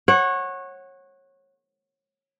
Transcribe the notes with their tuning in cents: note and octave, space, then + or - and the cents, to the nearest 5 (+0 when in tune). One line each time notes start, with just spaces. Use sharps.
C#5 -25 F#5 +0